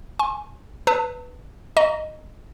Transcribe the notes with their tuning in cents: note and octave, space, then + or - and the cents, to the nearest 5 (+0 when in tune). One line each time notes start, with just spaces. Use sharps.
G#5 +0 C6 +40
B4 +0 A5 +35 E6 -35
D#5 -10 A#5 +0 C#6 +35